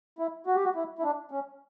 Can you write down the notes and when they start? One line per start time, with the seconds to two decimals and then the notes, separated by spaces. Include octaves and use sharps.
0.19 E4
0.47 F#4
0.55 G4
0.64 F#4
0.75 E4
0.99 E4
1.03 D4
1.31 C#4